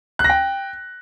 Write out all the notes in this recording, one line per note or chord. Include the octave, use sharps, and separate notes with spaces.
F#6
A#6
G5